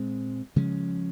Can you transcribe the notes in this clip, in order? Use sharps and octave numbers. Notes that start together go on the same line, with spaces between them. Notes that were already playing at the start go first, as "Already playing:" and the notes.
Already playing: A#2 G#3 C4
C#3 F3 G#3 C#4